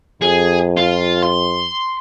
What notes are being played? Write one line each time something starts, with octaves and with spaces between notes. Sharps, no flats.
F2 G#4
F4
C6